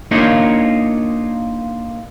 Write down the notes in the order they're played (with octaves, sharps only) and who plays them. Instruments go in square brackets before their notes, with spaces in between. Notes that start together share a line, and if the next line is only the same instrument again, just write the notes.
[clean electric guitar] A#3 D4 D#4 F4 A#4 C#5